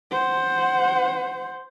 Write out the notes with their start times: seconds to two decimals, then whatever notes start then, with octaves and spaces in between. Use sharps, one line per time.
0.11 C5 F#5